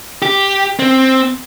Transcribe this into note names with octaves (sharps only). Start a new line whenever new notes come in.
G4
C4